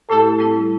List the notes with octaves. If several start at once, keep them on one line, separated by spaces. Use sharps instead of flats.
A2 A3 E4 G4 A4
A2 G3 C4 E4